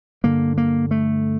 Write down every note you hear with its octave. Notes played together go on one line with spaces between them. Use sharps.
G2 D3 A#3
A#3
A3